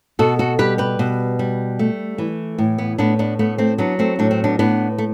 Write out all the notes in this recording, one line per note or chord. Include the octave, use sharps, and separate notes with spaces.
B2 F#4 A4
F#4 A4
G3 G4 B4
G4 B4
B2
G3
A3
E3
A2
B3
A2 B3 D4
B3 D4
A3 B3
A3 C4
F#3 B3 D4
A3 C4
A2 D4
C4
B3 D4
A2 B3 D4
A3